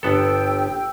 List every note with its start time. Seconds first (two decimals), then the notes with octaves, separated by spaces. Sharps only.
0.03 G1 B3 A4 G5 E6